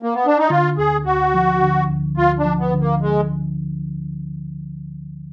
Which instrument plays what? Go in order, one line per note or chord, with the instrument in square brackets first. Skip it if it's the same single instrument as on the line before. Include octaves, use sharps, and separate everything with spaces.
[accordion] A#3
B3
D4
D#4
[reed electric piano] D3 [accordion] F4
[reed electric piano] D2 [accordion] G#4
[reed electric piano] D2 [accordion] F#4
[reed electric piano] F3
D3
D2
[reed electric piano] D2 [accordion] F4
[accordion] D4
[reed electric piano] F3
[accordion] B3
[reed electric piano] D3
[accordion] A#3
G#3